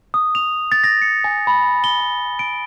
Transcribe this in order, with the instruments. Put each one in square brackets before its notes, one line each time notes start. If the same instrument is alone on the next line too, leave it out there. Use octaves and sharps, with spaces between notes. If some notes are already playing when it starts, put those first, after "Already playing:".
[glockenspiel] D#6
F7
A6
A#6
C#7
G#5
B5
G7
B5
D7